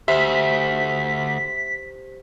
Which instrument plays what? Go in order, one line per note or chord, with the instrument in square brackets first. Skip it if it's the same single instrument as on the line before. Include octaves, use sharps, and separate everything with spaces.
[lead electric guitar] D2 [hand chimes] G4 C5 [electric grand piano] E5 [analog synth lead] B6